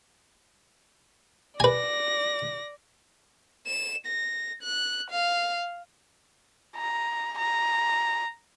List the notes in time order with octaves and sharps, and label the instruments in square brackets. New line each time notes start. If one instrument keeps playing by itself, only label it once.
[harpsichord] B4 G#5 [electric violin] D5 A#6
[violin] E7
A#6
F#6
F5
[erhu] A#5
A#5